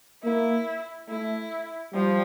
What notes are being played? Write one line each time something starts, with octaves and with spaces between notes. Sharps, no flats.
A#3 E4
A3 E4
F3 G3